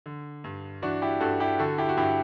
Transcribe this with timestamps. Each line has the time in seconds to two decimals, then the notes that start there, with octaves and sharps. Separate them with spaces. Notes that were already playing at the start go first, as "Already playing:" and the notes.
0.06 D3
0.44 G2
0.82 E3 D4 F#4
1.02 E4 G4
1.20 G2 F#4 A4
1.40 E4 G4
1.59 D3 F#4 A4
1.78 E4 G4
1.89 F#4
1.97 G2 E4 G4